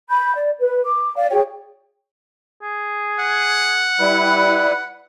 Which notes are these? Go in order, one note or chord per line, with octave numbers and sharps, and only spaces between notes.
B5 G6
D5
B4
D6
D5 F5
F#4 G#4 C#5 G5
G#4
F#5
G3 E4 B4